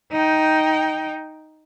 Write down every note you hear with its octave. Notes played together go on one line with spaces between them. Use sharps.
D#4 G5